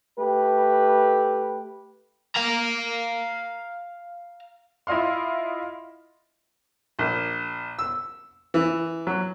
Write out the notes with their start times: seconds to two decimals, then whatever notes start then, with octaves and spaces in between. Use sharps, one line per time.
0.18 A3 G4 B4
2.36 F5 A#5
4.87 E4 F4 D#5 F5 C6
6.99 A#1
7.79 E6
8.54 E3
9.07 F#3